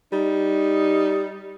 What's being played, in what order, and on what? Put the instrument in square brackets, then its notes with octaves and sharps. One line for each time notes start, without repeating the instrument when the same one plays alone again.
[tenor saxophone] G3 [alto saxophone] D#4